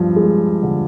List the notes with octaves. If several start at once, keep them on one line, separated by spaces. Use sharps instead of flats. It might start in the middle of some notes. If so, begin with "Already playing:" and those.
Already playing: G2 F3
G#3
D3